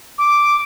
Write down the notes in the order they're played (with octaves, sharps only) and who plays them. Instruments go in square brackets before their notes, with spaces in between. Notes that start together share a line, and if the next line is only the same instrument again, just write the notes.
[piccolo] D6